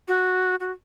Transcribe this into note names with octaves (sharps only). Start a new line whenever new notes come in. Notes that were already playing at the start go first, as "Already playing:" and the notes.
F#4
F#4